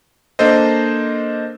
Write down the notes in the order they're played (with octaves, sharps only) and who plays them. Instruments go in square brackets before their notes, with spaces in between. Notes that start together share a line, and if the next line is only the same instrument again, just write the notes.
[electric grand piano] A#3 D4 A4 C5 D#5